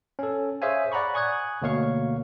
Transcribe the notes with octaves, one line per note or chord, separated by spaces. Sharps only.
C#4 A4
G#4 C5 C#5 E5 F5 G#5
D5 F#5 A#5 B5 C#6
G#5 C#6 D#6 F#6 G#6
D2 B2 A#3 C#5 F5 C#6